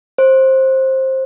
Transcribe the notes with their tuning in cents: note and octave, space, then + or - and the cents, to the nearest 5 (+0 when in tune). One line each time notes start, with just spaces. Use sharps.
C5 +15